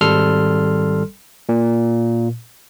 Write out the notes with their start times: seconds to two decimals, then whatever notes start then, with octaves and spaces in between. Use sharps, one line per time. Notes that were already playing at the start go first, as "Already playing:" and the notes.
0.01 G#1 G3 A4 C6 F6
1.49 A#2